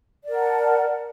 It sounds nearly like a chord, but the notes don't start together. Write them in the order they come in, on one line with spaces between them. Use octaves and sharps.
D5 A#4 F#5 A5